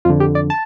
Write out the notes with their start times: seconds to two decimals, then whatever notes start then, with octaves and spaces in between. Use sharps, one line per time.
0.05 F2 D3 F4
0.20 G4
0.35 D5
0.50 A5